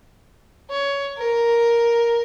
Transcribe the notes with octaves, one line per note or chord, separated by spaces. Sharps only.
C#5
A#4